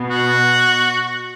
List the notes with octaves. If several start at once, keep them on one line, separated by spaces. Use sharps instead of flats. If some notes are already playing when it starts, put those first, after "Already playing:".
Already playing: B2 B3
F#4